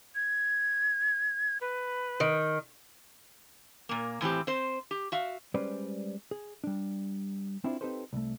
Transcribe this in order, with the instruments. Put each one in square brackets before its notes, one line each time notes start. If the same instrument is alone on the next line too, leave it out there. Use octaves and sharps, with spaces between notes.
[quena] G#6
B4
[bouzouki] D#3
[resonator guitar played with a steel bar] A#2 A#3
A2 E3 C4 G4
C4 C5
G4
F#4 E5 F5
[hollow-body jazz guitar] G3 G#3 C#4 B4 C5 D5
G#4
G3 D4
C4 D4 E4 F4 B4 C5
C4 D#4 G4 A4 B4 C5
C2 A3